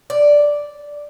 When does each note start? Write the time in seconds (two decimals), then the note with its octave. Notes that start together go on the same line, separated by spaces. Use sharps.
0.10 D5